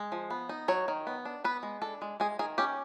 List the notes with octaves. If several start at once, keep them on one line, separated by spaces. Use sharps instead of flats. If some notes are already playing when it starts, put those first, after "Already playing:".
Already playing: G#3
F3
B3
D#4
F#3 C#5
D#3
B3
D4
B3 B4
G#3
D4 A4
G#3
G#3 G#4
D#3 G#4
C#4 G4